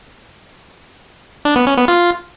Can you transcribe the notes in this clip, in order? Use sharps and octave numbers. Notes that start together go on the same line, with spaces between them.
D4
B3
C#4
B3
F4